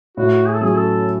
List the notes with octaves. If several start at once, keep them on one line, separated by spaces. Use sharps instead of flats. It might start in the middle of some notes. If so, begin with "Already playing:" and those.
A2 F#4
G#4
A4
F#3 C#4 F#4 G#4
A4